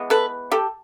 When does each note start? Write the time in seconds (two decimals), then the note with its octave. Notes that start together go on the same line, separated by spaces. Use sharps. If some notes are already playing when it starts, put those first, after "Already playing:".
Already playing: E3 G#3 B3
0.10 A4 B4
0.52 G4 A4